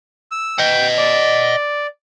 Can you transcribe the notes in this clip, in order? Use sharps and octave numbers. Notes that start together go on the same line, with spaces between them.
E6
D#5 F#5 G5
D5